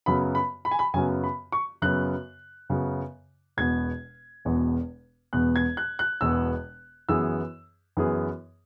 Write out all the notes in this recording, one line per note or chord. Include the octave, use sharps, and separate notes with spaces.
F#2 C#3 F#3 B3 B5
B5
B5
G#5
B5
F#2 C#3 F#3 B3 G#5
B5
C#6
F#2 C#3 F#3 B3 F#6
F#2 C#3 F#3 B3
E1 E2 B2 B3 G#6
E1 E2 B2 B3
E1 E2 B2 B3 F#6
G#6
F#6
F#6
E1 E2 B2 B3 E6
F#2 E3 B3 G#4 E6
F#2 E3 B3 G#4